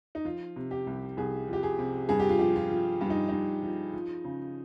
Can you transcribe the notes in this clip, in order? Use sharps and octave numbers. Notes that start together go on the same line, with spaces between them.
D#4
F3 F4
C3
G4
C2
C2 G#4
F3 G4
G#4
C3
G2 G#4
G4
F4
F3 G4
F4
F3
G2 F4
D#4
G2 D#4
F3
F3
C#3